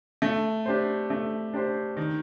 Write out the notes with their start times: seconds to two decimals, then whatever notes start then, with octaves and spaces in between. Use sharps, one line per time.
0.22 A3
0.66 D4 G4 C5
1.10 A3
1.54 D4 G4 C5
1.97 D#3